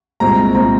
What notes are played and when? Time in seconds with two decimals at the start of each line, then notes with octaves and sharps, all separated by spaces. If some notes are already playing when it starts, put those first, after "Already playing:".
0.20 C2 A#2 G#3 C4 A#5
0.55 A#2 G#3 C4 A#5